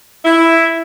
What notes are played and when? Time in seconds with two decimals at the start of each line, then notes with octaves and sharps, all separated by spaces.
0.25 E4